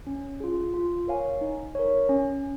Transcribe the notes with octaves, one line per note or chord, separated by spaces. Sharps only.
C#4
F4 G#4
F4
A#4 C#5 F5 G#5
D#4
A#4 C#5
C#4